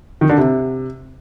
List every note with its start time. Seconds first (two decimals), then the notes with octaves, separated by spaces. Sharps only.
0.21 D#3
0.29 D3
0.38 C3